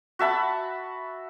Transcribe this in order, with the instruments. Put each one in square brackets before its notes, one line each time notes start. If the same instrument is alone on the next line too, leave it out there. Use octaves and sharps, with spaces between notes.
[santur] F#4 E5 A5 B5